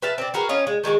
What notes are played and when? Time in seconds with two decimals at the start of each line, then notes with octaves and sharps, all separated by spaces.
0.02 B4 E5 F5 A5
0.18 C4 D4
0.34 F#4 G#4 A#4 B4
0.49 C#4 F4 D#5
0.67 G#3
0.84 D#3 G#3 F#4 G#4